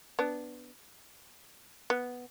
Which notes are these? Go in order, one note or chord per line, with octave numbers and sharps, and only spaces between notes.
B3 D4
B3